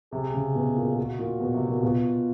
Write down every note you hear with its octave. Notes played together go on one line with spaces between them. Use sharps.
C3 G#4
C#3
B2
A#2
F#4
A#2
B2
C3
A#2
B2 F4